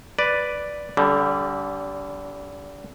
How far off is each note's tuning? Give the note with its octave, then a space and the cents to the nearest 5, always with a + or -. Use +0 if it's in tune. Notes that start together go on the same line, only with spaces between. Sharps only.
B4 +0 D5 +0
D3 -35 G3 -15